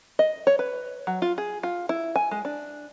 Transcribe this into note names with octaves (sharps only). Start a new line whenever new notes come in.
D#5
C#5
B4
F#3
F4
G#4
F4
E4
G#5
G#3
D4